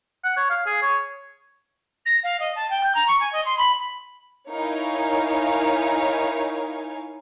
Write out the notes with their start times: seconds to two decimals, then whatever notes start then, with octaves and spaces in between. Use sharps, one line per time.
0.24 F#5
0.37 C#5
0.50 F5
0.66 G#4
0.82 C#5
2.05 A#6
2.23 F5
2.39 D#5
2.55 A5
2.70 G5
2.83 G6
2.94 A#5
3.07 C#6
3.20 G#5
3.32 D#5
3.45 C6
3.57 B5
4.50 D#4 E4 A#4 C#5 F5 G#5